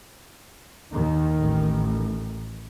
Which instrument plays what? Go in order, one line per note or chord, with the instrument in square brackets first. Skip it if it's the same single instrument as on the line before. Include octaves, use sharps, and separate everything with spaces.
[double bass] D#2 [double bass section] D#3
[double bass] A1